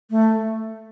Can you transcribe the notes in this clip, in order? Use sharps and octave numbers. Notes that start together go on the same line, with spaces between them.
A3